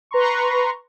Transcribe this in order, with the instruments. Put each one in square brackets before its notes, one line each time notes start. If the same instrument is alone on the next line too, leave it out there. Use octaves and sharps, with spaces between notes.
[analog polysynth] B4 A#5 C6 C#6